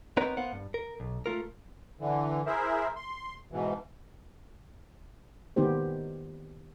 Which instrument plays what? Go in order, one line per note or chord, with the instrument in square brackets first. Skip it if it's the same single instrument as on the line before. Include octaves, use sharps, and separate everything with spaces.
[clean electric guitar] B3 C4 D#4 A#4 B4 C#5
B3 A#4 C5 F5 F#5
G2
A#4
B1
A3 F4 A#4
[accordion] D3 E3
E4 G#4 A#4 C5 E5
C6
G#2 B2 E3
[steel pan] D#3 A#3 B3 D#4 G4 C5